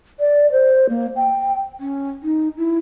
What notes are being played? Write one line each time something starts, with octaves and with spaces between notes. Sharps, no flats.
D5
C5
A#3
G5
C#4
D#4
E4